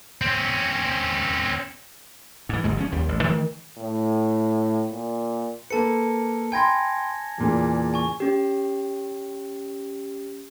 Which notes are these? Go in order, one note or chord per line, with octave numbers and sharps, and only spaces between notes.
C4 C#4
G#2 E3
G1 G#2 G#3
F3 C#4
D#2 G3
A1
D#3 E3 A3
A2
A#2
A#3 A4 B4 A5 C#7
G5 G#5 B5 C6 G#6 A#6
E2 A#2 C#3
G#5 C#6
C#4 G4